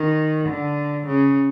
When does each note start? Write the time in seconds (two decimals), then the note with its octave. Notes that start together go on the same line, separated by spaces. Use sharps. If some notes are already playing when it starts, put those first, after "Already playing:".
Already playing: D#3
0.49 D3
1.07 C#3